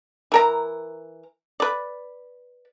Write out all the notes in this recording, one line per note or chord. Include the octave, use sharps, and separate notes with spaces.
E3 A#4 A#5
B4 D5